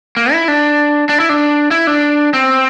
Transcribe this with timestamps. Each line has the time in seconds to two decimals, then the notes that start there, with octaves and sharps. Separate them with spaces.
0.17 A#3
0.33 E4
0.48 D4
1.09 D4
1.20 E4
1.29 D4
1.71 E4
1.87 D4
2.33 C4